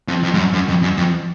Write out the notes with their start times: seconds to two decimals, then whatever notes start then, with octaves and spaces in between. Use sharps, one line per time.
0.08 F2
0.23 F2
0.34 G#2
0.38 F#2
0.53 F#2
0.68 F2
0.83 F#2
0.97 F2